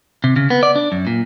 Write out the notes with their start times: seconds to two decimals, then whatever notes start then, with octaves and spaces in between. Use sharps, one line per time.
0.24 C3
0.36 C#3
0.50 B3
0.63 D5
0.76 D4
0.92 F#2
1.07 A#2